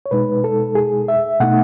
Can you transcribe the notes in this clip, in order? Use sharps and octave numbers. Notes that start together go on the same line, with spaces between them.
C#5
B2 G#3 D#4 B4
A4
G#4
E5
B2 A3 D#4 F#5